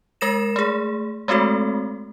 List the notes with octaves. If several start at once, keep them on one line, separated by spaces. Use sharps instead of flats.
G#3 A#4 A#6 E7
A3 G#4
G#3 A3 C4 F#4 A4